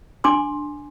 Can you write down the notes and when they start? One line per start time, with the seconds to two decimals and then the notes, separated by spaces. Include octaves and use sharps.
0.24 D4 G#5 C6 D6